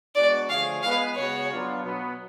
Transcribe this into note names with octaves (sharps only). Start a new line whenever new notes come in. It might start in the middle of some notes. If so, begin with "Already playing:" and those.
G#3 B3 D4 F#4 D5
D3 F3 A3 C#4 G#4 F5
G#3 B3 F4 B4 F5
C#3 G#3 B3 F#4 C#5
F#3 B3 D4 F4
B2 F#3 B3